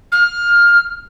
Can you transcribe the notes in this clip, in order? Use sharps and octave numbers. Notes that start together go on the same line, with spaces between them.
F6